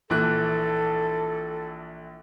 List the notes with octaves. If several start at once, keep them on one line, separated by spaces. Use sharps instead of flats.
A#1 E3 A4 F#6